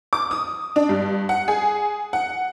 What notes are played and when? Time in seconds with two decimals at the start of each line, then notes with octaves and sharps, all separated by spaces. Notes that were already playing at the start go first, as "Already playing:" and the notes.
0.13 D6
0.31 D#6
0.76 D4
0.89 G2
1.29 F#5
1.48 G#4
2.13 F#5